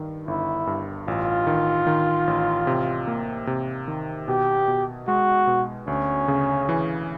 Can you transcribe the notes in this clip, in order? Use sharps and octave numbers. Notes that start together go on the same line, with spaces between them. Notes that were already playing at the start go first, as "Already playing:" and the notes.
Already playing: G2 D#3
G1 E4
G2
A1 F4
D#3
D#3
A1
C3
A#3
C3
D#3
B2 G4
B2
G#3 F#4
B2
D2 C#4
C#3
E3